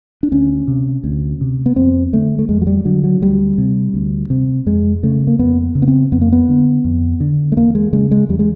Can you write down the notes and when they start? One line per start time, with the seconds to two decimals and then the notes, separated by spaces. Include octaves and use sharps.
0.23 D4
0.32 D2 C#4
0.68 C3
1.04 D2
1.41 C3
1.66 B3
1.76 F2 C4
2.13 D3 A3
2.39 A3
2.49 F2 G#3
2.62 F#3
2.67 G3
2.85 D3 F#3
3.04 F#3
3.21 D2 G3
3.58 C3
3.94 D2
4.30 C3
4.66 F2 G#3
5.03 C#3 A3
5.27 A#3
5.39 F2 B3
5.75 C#3
5.82 B3
5.88 C4
6.12 F2 B3
6.22 A#3
6.32 B3
6.48 D3
6.84 F2
7.20 D3
7.52 A3
7.57 E2 A#3
7.75 G#3
7.93 C#3 G#3
8.11 G#3
8.29 E2 G3
8.39 G#3